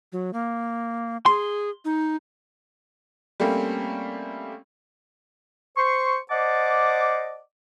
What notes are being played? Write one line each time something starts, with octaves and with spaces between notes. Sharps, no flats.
F#3
A#3
G#4 C6
D#4
G3 A3 A#3 C4 C#4
C5 C6 C#6
C5 D5 D#5 F#5 A5 D6